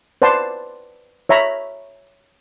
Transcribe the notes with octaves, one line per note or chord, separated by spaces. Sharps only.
B4 C5 D5 F#5 A5 C6
C#5 E5 A#5 B5